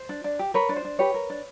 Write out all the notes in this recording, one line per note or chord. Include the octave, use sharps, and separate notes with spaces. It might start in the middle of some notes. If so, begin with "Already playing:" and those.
Already playing: C5
D4
D4
G4
A#4 B4 C#5
D4
C5
D4
G4 B4 C#5
A#4
D4